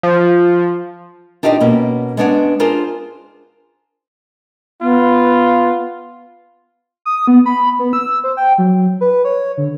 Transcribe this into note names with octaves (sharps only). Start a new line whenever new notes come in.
F3
D4 D#4 F4 G4 D5 D#5
B2 A#3 C#4
G#3 B3 C#4 D4 C#5 F#5
D4 F4 G#4 A#4 C5
B3 F4
D#6
B3
B5
B3
E6
C5
G5
F#3
B4
C#5
D3